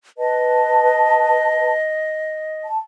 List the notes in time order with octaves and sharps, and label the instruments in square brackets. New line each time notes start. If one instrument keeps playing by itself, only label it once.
[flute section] B4 A5 [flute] D#5
[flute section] A5